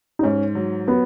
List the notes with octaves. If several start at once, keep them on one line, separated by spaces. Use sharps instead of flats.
D#4
G#2 C#4
F#3
F#3 B3